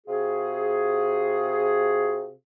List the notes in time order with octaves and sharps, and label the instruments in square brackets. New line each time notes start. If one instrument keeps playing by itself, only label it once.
[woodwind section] C3 F4 F#4 G#4